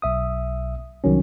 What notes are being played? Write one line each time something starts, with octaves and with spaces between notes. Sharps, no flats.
B1 E5 D#6
C2 D#3 F#3 C#4